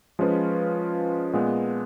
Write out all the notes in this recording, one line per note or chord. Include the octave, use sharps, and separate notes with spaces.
F3 G#3 C#4 F4 B4
A#2 G#3 B3